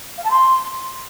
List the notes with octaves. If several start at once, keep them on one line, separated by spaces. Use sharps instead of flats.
F5
A5
C6